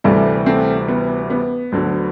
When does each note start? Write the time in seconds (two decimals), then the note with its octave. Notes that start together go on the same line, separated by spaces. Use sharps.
0.04 D2 C3 E3 G3 A3
0.46 A3 C4
0.88 B3
1.30 B3
1.72 D2 D3 F#3